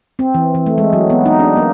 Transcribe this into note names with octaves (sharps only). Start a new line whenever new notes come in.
C4
E3
E3
A3
G#3
F#3
B3
D#4
D4
A#3